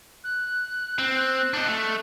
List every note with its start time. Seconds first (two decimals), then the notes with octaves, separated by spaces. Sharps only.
0.24 F#6
0.99 C4
1.54 D4 D#5
1.68 A3